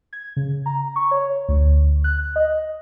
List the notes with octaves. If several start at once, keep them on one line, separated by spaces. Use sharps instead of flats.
G#6
C#3
A#5
C#6
C#5
D2
F#6
D#5